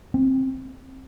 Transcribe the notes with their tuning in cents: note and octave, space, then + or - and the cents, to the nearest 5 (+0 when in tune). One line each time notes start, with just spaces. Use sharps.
C4 +15